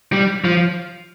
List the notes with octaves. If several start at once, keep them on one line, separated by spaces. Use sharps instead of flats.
G3
F3